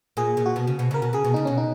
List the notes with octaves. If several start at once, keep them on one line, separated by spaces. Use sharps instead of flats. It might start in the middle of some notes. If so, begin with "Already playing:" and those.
A#2 G#4
A#2
F#4
B2
C#3
B2
C#3 A#4
B2
C#3 G#4
B2
C#3 D#4
B2 C#4
D#4